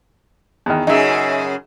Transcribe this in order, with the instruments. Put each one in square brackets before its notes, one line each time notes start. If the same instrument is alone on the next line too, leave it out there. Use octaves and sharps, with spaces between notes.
[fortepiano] E2 D#3
[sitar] F#2 C#3 [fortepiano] D#4 G#4 E5